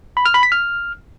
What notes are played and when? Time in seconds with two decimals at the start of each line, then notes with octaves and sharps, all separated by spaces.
0.17 B5
0.26 F6
0.34 B5
0.43 B6
0.52 F6